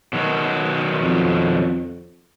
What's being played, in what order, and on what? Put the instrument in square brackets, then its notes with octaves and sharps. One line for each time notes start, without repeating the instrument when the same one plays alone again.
[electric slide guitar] B2 D#3 F#3
[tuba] F2